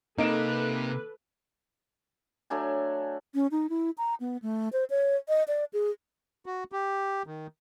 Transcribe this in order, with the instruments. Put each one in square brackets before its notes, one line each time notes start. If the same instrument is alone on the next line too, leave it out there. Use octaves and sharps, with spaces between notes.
[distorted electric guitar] C3 [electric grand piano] A#3 [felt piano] D#4 D7 E7 [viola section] A4 B4
[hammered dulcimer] F#3 A3 D4 G#5
[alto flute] C#4
D#4
E4
A#5
B3
A3
C5
C#5
D#5
D5
G#4
[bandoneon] F#4
G4
D#3